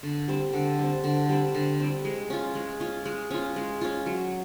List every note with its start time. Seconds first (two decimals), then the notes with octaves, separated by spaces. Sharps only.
0.03 D3
0.28 G3 C4
0.53 D3
0.79 G3 C4
1.04 D3
1.29 G3 C4
1.55 D3
1.80 G3 C4
2.05 G#3
2.30 C#4 F4
2.55 G#3
2.80 C#4 F4
3.05 G#3
3.31 C#4 F4
3.56 G#3
3.81 C#4 F4
4.06 F#3